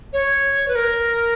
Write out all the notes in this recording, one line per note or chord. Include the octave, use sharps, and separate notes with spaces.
C#5
B4
A#4